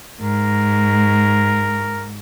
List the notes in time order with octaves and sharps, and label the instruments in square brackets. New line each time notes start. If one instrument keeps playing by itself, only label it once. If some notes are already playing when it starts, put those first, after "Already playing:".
[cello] G#2 [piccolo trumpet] A#4